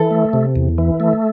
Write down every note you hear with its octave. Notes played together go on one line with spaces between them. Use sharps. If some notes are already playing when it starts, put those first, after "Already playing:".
Already playing: E3 A4
A3
C3
E2
E3
A3